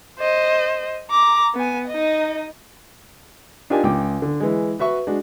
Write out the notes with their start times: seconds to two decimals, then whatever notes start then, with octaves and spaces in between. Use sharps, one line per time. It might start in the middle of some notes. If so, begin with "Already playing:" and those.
0.20 C5 D#5
1.11 A#5 D6
1.55 B3 G#5
1.88 D#4 D#5
3.70 D4 D#4 F4 G4 A#4 G#5
3.83 C#2 G5 D6
4.22 D3
4.40 E3 G#3
4.79 F#4 B4 E5 C#6
5.07 G#3 D4 F#4